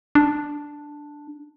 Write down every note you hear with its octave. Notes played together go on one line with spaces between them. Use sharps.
D4